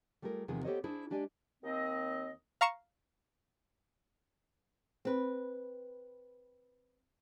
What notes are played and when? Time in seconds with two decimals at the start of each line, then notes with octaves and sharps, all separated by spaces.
0.22 G3 A3 F4 G#4 A#4
0.48 E2 C3 D#3 F3 B3 G#4
0.65 B3 G4 A4 C5 C#5 D#5
0.84 D4 E4 G#4 C5
1.10 G#3 D4 G4 D5 G#5
1.63 D#2 C4 D#5
2.61 F5 A#5 C#6 C#7 E7
5.05 C4 B4